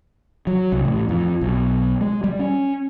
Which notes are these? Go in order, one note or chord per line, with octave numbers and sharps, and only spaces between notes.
F#3
C2
A1
F2
B1
G#3
G3
C#4